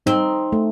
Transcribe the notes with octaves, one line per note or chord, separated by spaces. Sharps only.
C4 D#4
A3